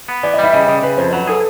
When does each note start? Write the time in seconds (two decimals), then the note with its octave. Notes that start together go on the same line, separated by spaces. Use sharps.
0.08 B3
0.23 E3 D5
0.34 D#5
0.39 G3
0.44 E5
0.53 C#3 D#5
0.68 C#3 D#5
0.83 C#3 B4
0.98 F2 C5
1.13 F#3 B4
1.27 G#4 A4